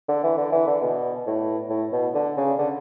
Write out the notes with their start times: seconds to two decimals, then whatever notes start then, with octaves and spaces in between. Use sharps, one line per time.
0.08 D3
0.23 E3
0.37 D3
0.52 E3
0.67 D3
0.82 B2
1.27 A2
1.70 A2
1.92 B2
2.14 D3
2.37 C#3
2.58 D3